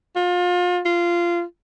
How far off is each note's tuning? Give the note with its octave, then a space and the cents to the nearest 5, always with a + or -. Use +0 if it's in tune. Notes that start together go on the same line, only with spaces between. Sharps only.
F4 +30
F4 -15